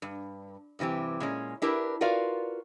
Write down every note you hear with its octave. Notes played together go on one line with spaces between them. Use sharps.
G2
G2 C3 E3 C4 G4
A#2 G#3 C#4
D4 E4 G4 A#4 B4
F4 F#4 A#4 B4 D5 F5